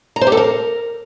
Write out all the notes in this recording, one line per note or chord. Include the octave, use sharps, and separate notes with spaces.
A#5
C5
G4
A4
A#4